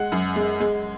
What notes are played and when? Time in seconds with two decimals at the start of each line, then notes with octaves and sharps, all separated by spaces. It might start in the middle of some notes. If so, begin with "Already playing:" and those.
Already playing: G#3 F#5
0.12 F#2
0.36 G#3
0.60 G#3